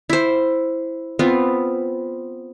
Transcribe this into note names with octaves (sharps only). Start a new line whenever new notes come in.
E4 C5
B3 C4 F4